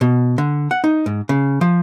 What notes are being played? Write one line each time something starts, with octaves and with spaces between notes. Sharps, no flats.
B2
D3
F#5
D#4
G#2
C#3
F3